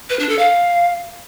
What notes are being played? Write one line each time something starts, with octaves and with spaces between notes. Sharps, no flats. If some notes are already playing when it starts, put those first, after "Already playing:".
B4
D4
A4
F5